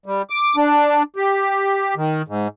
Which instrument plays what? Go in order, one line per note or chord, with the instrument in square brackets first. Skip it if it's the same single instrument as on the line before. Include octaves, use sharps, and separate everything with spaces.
[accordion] G3
D6
D4
G4
D#3
G#2